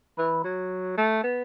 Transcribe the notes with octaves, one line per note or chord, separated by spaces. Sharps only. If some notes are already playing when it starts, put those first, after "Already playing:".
E3
F#3
A3
B3